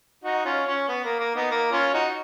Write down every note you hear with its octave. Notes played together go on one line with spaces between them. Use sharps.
D#4 F#4
C#4 F4
C#4
B3
A#3
A#3
B3 D#4
A#3
C#4 F4
D#4 F#4